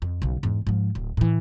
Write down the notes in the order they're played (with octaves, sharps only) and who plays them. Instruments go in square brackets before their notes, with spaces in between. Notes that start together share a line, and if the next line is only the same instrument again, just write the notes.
[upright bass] F2
B1 C#3
E2 G#2
G#2 F3
D1
A2 E3